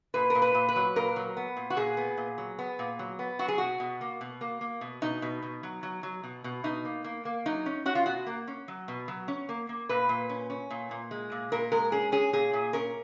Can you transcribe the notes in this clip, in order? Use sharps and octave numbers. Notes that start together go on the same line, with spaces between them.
A#2 B4
A#4
A#2
B4
A#2
B4
F#3
A#2 A#4
F#3
B3
A#2
F#4
A#2 G#4
B3
A#2
F#3
B3
A#2
F#3
B3
F#3 F#4
G#4
B2 F#4
B2
A#3
B2
A#3
A#3
B2
B2 D#4
B2
B2
F#3
F#3
F#3
B2
B2
B2 D#4
A#3
A#3
A#3
F#3 D#4
C#4
C#4 F#4
F4
B2 F#4
A#3
C#4
F#3
B2
F#3
C#4
A#3
A#3
A#2 B4
A#2
C#4
C#4
A#2
A#2
G#3
A#2
A#2 A#4
G#3 A#4
C#4 G#4
C#4 G#4
A#2 G#4
A#2
C#4 A#4